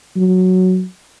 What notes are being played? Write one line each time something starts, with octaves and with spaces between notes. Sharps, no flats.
F#3